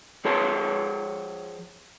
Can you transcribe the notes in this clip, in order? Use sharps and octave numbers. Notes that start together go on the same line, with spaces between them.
F3 G#4 C#5 A5 C6